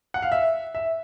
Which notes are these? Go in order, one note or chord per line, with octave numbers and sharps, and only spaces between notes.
F#5
F5
E5
E5